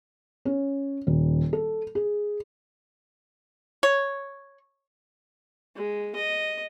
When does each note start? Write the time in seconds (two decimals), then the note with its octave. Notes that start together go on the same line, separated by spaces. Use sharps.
0.45 C#4
1.07 D#1
1.53 A4
1.95 G#4
3.83 C#5
5.76 G#3
6.16 D#5